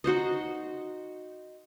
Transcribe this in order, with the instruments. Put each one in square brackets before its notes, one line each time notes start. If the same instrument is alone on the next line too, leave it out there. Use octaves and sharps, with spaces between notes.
[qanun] D#4 F#4 C5 D#5